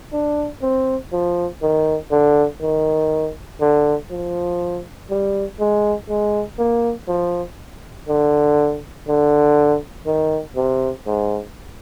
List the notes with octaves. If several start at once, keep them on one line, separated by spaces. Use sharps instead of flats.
D4
C4
F3
D#3
D3
D#3
D3
F3
G3
G#3
G#3
A#3
F3
D3
D3
D#3
C3
G#2